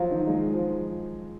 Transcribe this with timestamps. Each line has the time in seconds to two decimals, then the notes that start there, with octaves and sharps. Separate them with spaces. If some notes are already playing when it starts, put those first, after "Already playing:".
Already playing: F3 F#3 F5
0.11 D#3
0.27 G#3
0.53 F3